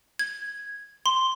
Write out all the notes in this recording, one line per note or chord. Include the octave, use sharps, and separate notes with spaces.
G#6
C6